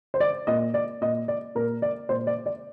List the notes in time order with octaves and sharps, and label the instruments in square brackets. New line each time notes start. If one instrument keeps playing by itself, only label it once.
[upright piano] C5
D5
A#2 D#5
D5
A#2 D#5
D5
A#2 A#4
D5
A#2 C5
D5
D5